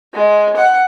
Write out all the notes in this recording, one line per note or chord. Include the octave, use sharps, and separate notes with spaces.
G#3
F#5